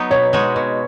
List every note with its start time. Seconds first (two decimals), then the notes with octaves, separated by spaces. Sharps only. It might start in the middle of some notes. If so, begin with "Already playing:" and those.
Already playing: F#3 B3 D#4
0.11 B2 C#5
0.33 G#3 D#4 F#4
0.56 B2